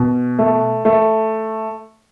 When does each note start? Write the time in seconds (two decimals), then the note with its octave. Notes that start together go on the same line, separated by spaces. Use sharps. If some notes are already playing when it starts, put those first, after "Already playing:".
Already playing: B2
0.39 A3
0.85 A3